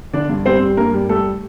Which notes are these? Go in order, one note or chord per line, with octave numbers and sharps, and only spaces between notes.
D3 D4 D5
G2
G3 C4 C5
G3
G2 A#3 A#4
G3
G3 A3 A4